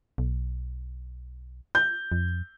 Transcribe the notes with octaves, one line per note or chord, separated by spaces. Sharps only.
B1
G6
F2